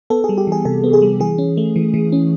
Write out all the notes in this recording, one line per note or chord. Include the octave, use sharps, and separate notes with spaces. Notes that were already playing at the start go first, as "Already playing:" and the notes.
B3 A4
G#4
G3
G4
E3 G#4
C3 A4
B3
G#4
G3
E3 G#4
C#4
A3
E3
E3
C#4